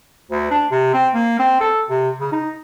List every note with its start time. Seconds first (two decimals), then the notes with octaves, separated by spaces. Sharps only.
0.30 D2
0.51 D4
0.71 C3
0.94 C4
1.14 A#3
1.39 C4
1.60 A4
1.90 C3
2.20 C#3
2.32 D#4